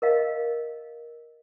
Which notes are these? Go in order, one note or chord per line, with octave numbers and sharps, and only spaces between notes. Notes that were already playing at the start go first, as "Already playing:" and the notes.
A#4 D#5 F5